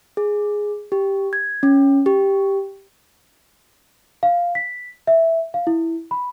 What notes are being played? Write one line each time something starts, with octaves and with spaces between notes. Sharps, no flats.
G#4
G4
G#6
C#4
G4
F5
B6
E5
F5
E4
B5